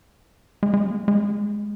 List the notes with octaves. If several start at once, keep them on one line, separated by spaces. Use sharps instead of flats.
G#3
G#3
F#3
A#3
G#3
G#3